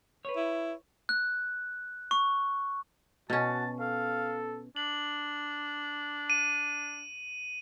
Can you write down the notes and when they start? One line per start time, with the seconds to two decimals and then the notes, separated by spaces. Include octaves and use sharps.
0.25 B4 C#5
0.36 E4
1.09 F#6
2.11 C#6
3.30 B2 C#4 F#4 A5
3.80 A4 F5
4.76 D4 F#7
6.30 D#7